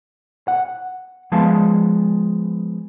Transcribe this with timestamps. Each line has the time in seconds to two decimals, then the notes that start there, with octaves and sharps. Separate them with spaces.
0.48 F#5
1.32 F3 G#3 B3 F5 A5